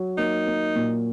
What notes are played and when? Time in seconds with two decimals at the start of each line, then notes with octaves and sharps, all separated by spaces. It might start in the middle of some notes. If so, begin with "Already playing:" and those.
Already playing: F#3
0.18 A#3 D#4
0.47 A#3
0.76 A#2